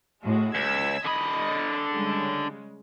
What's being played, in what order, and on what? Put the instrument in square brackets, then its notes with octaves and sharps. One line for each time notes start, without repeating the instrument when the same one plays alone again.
[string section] A2 G#3 F#4
[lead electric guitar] C#2 [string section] E6 G#6 B6
[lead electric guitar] D3 B5 [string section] D#5
[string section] C#3 G3 G#3